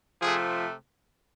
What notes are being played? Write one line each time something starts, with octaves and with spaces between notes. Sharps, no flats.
C3 F3 A3 G#4